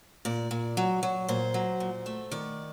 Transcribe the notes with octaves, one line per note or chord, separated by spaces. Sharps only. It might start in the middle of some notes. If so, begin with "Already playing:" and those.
A#2 D5
A#2
F#3
F#3
A#2 C5
F#3
A#2
A3
D#3 D5